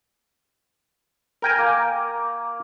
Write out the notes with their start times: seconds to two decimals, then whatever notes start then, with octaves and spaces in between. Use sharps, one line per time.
1.42 A#4 G5 G#5
1.58 A#3